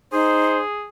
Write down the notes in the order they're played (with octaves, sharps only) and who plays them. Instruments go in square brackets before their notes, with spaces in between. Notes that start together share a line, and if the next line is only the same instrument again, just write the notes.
[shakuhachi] D#4 [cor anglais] G#4 [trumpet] C5